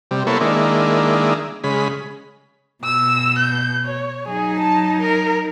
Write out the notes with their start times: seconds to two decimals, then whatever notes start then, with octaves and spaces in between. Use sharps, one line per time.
0.11 C3 G3
0.27 A#3 B3 E4 A4 C5 C#5
0.41 D#3 G#3 A#3 D4 E4
1.64 C#3 G#3 B5
2.84 B2 E6
3.39 G6
3.85 C#5
4.28 F#3 D#4 G#4
4.60 A5
5.01 A#4